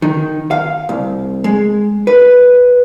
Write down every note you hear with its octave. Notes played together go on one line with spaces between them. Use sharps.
D#3
F5
C2
G#3
B4